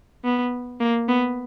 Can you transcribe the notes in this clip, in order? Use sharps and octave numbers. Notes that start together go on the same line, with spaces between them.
B3
A#3
B3